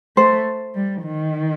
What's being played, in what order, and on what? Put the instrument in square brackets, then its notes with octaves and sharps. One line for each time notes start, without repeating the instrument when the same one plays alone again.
[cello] A3 [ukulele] C5
[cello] G3
D#3